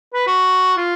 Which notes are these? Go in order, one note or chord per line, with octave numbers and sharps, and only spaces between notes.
B4
F#4
F4